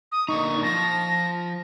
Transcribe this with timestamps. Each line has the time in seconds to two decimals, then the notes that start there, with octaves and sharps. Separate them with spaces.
0.12 D#6
0.28 A#2 D3 D#4 A#5 C#6
0.63 F3 A5 A#6